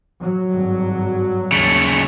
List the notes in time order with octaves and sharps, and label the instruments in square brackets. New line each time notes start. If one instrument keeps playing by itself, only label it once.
[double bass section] F#3
[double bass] G#1 G2
[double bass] D#2 [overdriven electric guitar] C#3 A3